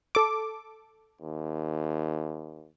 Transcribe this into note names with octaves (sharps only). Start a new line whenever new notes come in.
A4 D6
D#2